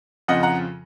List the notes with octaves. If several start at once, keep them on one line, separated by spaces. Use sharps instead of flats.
F2 C#3 F3 D#5 F#5
F#5 A#5